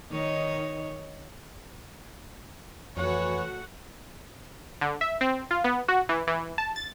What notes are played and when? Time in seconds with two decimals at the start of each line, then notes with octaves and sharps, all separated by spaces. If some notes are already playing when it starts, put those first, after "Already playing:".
0.11 D#3 D#4 C#5
2.97 F2 E3 A3 F#4 C#5 F#5
4.81 D3
5.01 E5
5.21 C4
5.51 F4
5.64 B3
5.88 F#4
6.09 E3
6.27 E3
6.58 A5
6.76 A6